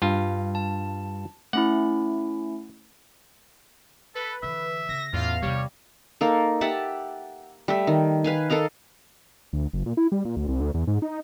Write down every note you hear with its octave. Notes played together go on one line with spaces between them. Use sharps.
G2 F4
A5
A3 C#4 E4 F#5
A4 B4
D3 E3 E5
C#3 A#6
E2 A2 C#4 F4 F5
C3 D#3 G3 C#5
A#3 D#4 A4
G4 E5 F#5 A5
G3 A3 E5
D#3
B4 F5 G#5
A4 A#4 D#5 F5
D2
F#1
A#2
E4
G3
A#2
D2
C2
D2
E2
G#2
D#4